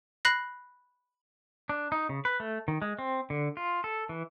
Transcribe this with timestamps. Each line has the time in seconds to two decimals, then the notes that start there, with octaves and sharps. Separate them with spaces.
0.25 B5 F#6 A#6 C7
1.69 D4
1.92 D#4
2.09 C#3
2.25 B4
2.40 A3
2.68 D#3
2.82 G#3
2.99 C4
3.30 D3
3.57 F4
3.84 A4
4.09 E3